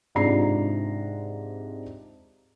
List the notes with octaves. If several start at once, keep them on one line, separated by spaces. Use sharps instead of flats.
G#2 C3 D4 F4 A#5 C7